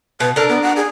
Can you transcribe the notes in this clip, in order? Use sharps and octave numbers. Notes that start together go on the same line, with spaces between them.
B2 B4
D4 A4 A#4
B3
F#5
G#4